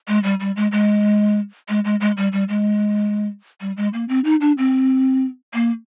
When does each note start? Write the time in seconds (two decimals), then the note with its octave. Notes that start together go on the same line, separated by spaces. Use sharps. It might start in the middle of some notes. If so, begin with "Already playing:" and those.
0.08 G#3
0.24 G3
0.40 G3
0.56 G#3
0.72 G#3
1.69 G#3
1.85 G#3
2.01 G#3
2.17 G3
2.33 G3
2.49 G#3
3.61 G3
3.77 G#3
3.93 A#3
4.09 C4
4.25 D#4
4.41 D4
4.58 C4
5.54 A#3